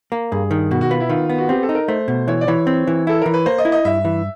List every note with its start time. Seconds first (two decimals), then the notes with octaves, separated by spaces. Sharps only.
0.12 A#3
0.32 G2 G#4
0.51 D#3
0.71 B2 F#4
0.81 F#4
0.90 B3 F4
1.00 E4
1.09 D#3 F4
1.30 B3
1.38 F#4
1.49 C4 G4
1.63 A4
1.69 D#4
1.75 A#4
1.88 A3 C5
2.08 B2
2.28 E3 C#5
2.41 D5
2.47 E3 C#5
2.67 C4
2.87 E3
3.07 E4 A4
3.22 E3 A#4
3.34 B4
3.46 A#3 C5
3.58 D#5
3.65 E4
3.72 D#5
3.85 G2 E5
4.05 E3